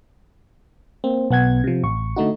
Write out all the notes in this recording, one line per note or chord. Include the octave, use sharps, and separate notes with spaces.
A#3 C4
B1 B3 F#5 G#6
C3 F3
A1 C#6
D3 A3 D#4 F#4